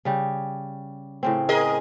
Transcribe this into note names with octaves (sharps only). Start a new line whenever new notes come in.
C#3 G3
A2 C#3 C4
G#4 A#4 D#5